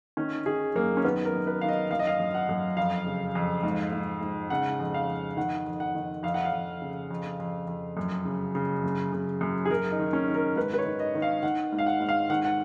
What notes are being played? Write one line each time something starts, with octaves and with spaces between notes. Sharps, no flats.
D#3 C#4
D#3 G#4
F#2 A#3
C#4
D#3 B3
A#4
F#2
B4
D#3 F5
D#5
F#2 F5
D#5
F5
F#2
F#5
F#2
F2 F5
C#3
F2
G#2
G#2
G#2
C#3 F#5
F2
F5
F2
D#3 F#5
F2
F#5
D#3
F2 F5
F#5
F5
F2
C#3
F2
F2
F2
F#2
C#3
C#3
F#2
C#3
F#2
G#4
F#2 A#4
D#4
D#3
C#4
D#3
A#4
G#2 B4
B4
C#5
D#3
D#5
D#3
F5
D#3 F#5
G#2
F5
F#5
G#2
F5
D#3 F#5
F#5